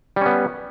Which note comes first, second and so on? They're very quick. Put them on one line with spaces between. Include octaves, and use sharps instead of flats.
G3 C#4 B3